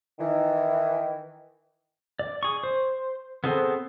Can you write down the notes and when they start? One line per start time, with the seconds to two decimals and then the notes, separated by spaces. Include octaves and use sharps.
0.19 D#3 E3
2.19 D5
2.43 G#4 C#6
2.64 C5
3.44 B3 C4 G#4 A4 C5